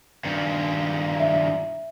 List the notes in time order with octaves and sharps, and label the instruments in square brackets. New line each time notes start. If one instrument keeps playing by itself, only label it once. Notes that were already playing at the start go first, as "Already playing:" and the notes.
[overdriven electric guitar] G2 D#3
[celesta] E5